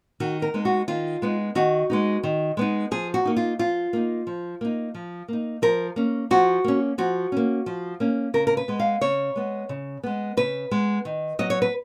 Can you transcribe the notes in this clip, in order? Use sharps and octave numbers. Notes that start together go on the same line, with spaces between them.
D#3 F#4
A#4
G#3 B3 D#4
F#4
D#3 F4
G#3 B3 D#4
D#3 F#4
G#3 B3 D#4
D#3
G#3 B3 D#4
F3 G#4
F#4
A#3 D#4
F4
F3 F4
A#3 D#4
F3
A#3 D#4
F3
A#3 D#4
F3 A#4
A#3 C#4
F3 F#4
A#3 C#4
F3 F#4
A#3 C#4
F3
A#3 C#4
C#3 A#4
A#4
B4
G#3 B3
F5
C#3 C#5
G#3 B3
C#3
G#3 B3
C#3 B4
G#3 B3
D#3
F#3 B3 D#5
C#5
B4